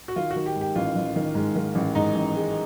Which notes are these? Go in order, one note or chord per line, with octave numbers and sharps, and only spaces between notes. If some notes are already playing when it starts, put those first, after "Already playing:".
F#4
D#3 F4
F#4
D#3
G4
G#2
G4
A1 F4
A1
D#3
G#2
D#3
A1
G#2 D#4
A1
G#3